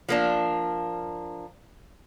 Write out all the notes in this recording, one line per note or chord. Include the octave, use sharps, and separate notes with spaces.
F3 A#3 D4